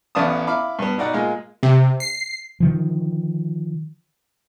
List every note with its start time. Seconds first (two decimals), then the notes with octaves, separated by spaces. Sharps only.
0.15 A1 B3 D5 F5 A5 D#6
0.47 E4 F5 B5 D6
0.79 G2 B3
0.98 B2 D#4 D5 F#5 B5
1.13 A#2 G#3 F5
1.63 C3
2.00 C7
2.60 D3 D#3 F3